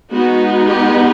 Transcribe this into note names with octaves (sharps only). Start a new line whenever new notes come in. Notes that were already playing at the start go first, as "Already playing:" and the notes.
G#3 B3 D#4 F#4
G4